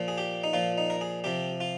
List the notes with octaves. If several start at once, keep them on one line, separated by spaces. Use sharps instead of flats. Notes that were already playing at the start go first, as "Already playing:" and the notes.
Already playing: A#2 F3
G#4
G4
D#4
A#2 F3 F4
D#4
A#4
G#4
C3 F3 G4
F4